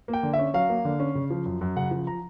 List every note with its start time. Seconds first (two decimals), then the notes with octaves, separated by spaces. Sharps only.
0.08 A#3
0.13 G5
0.23 D3
0.33 E5
0.39 C#4
0.54 F#3 F5
0.69 A#3
0.85 D3
1.00 C#4
1.15 C#3
1.30 F3
1.45 F#2
1.61 F#2
1.76 C#3 F#5
1.91 F3
2.07 A#5